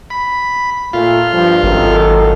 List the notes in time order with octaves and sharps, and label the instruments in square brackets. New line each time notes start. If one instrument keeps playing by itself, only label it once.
[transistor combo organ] B5
[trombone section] A#2 A3 [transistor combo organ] F4
[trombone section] G2 F3
[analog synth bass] G#1 [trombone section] F#2 D#3 A4